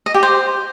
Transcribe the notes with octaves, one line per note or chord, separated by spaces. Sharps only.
D#5
G4
C5